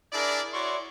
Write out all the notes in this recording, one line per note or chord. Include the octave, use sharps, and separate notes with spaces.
D4 E4 G#4 A#4 D5
E4 F#4 C#5 D5 C6 C#6